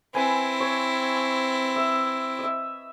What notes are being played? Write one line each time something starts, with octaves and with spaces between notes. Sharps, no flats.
C4 E4 B4 G#5
C#5
E5
D#5 E5